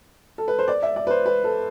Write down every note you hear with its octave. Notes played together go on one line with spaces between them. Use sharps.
A4
B4
C5
D5
E5
D5
B4
C5
B4
A4